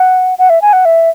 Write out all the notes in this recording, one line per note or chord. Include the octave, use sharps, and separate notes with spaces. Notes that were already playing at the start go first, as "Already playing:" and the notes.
Already playing: F#5
F#5
E5
G#5
F#5
E5